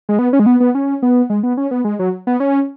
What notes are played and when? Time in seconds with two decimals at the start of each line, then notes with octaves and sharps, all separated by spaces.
0.09 G#3
0.19 B3
0.33 C#4
0.40 G#3
0.46 B3
0.60 B3
0.75 C#4
1.02 B3
1.30 G#3
1.43 B3
1.57 C#4
1.71 B3
1.85 G#3
1.99 F#3
2.27 B3
2.40 C#4